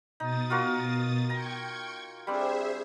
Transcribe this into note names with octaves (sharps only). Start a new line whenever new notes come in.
B2 D#4 D#6 A6
F4 F#4 A#4
G5 A#5 C#6 G#6
G3 C4 D4 G#4 C5 E5